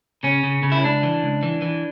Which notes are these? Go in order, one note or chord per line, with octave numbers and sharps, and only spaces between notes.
C#3 C#4
C#3
C#3
E4
C#2 D4
E3
C#2
E3
E3